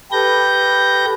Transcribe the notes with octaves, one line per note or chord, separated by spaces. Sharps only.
G4 A4 B4 G6 A#6